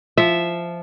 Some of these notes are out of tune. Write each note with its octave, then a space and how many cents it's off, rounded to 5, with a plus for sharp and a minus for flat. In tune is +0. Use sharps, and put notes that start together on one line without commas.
F3 -10 E5 +0